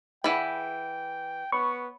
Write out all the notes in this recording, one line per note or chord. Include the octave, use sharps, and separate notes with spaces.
E3 G#4 D5 F#5 G5 B5
B3 C#5 B5 C#6